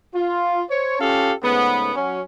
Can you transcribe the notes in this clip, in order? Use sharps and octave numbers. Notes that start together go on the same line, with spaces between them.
F4
C5 C#5
C#4 F4 G4 A4 F5 A5
G#2 C#3 A3 B3
F#3 C#4